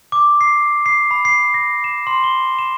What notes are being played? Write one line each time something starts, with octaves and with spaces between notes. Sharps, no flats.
D6
C7
C7
B5
C7
A#6
E7
C6
G7
E7